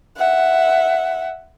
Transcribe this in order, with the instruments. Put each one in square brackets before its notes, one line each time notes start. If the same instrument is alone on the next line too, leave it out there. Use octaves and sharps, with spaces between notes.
[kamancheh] E5 F#5